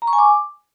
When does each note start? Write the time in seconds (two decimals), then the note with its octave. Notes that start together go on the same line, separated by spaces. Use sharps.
0.02 A#5
0.07 C#6
0.13 G#5
0.19 D6